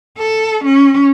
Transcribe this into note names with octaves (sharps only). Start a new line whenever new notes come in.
A4
C#4